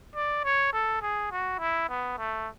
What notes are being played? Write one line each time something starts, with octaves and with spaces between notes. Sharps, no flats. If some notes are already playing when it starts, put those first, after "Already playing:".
D5
C#5
A4
G#4
F#4
E4
B3
A3